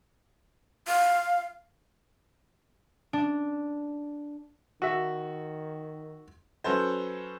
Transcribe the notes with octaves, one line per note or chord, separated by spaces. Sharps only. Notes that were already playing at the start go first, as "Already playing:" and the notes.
F5
D4
D#3 F#4 E5
F#3 C#4 A4 B4 C5